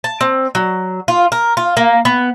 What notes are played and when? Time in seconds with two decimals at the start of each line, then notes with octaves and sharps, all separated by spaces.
0.04 A5
0.21 C4
0.55 F#3
1.08 F4
1.32 A#4
1.57 F4
1.77 A#3
2.05 B3